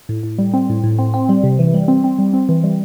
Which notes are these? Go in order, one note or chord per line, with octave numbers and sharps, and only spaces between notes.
A2
A2
G3
C4
A2
A2
C4
C4
G3
C3
E3
G3
C4
C4
G3
C4
E3
G3